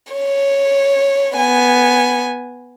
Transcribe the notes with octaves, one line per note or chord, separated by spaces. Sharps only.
C#5
B3 G#5